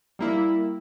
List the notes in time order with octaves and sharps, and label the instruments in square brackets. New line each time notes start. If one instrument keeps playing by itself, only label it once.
[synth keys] G3 A#3 E4